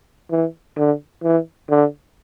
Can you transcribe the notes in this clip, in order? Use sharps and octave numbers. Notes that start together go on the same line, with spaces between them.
E3
D3
E3
D3